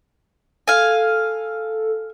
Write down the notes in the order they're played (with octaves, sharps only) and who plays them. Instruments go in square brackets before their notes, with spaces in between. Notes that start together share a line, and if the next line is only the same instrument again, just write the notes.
[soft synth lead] A4 [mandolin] F5 G#5